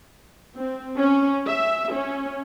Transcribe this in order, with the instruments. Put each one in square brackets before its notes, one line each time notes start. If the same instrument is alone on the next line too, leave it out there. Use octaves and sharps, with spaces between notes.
[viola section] C4
C#4
E5
C#4